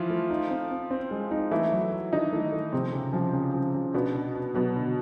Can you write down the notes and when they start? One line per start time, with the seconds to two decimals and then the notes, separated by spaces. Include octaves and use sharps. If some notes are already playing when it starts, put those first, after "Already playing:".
Already playing: E3 F3 E4 F4
0.10 A3
0.30 D#4
0.50 C4
0.71 C4
0.90 C4
1.11 G#3
1.31 D#4
1.51 E3 A3 E4
1.72 F#3
1.92 F#3
2.12 D#3 D4 D#4
2.33 A3
2.52 A3
2.72 C3 F3 C4
2.93 C#3
3.13 F3
3.33 C#3
3.54 F3
3.74 C#3
3.94 B2 B3 D4
4.14 D4
4.34 D4
4.54 B2 F#3 B3
4.76 D3